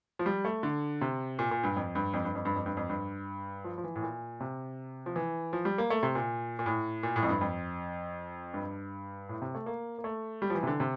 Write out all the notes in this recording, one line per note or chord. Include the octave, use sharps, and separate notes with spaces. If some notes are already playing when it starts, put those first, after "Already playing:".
F3
G3
A3
D3
C3
A#2
A#2
G2
F2
G2
F2
G2
F2
G2
F2
G2
F2
G2
F3
F3
E3
A2
A#2
C3
F3
E3
F3
G3
A#3
A3
C3
A#2
A#2
A2
A#2
A2
F2
G2
F2
G2
A2
C3
A3
A#3
A#3
A3
G3
F3
E3
C3
D3
C3